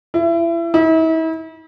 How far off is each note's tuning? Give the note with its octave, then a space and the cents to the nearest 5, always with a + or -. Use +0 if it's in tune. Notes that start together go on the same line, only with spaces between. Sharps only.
E4 +30
E4 -40